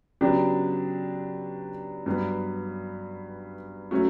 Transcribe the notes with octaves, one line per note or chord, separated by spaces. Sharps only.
C#3 F#3 B3 D4 G4
G2 F#3 B3
F#3 A3 C#4 F#4